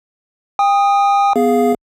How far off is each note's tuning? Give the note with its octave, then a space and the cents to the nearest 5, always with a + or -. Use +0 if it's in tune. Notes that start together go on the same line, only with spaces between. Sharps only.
G5 +35 D#6 +0
B3 +0 G#4 +0 F5 +0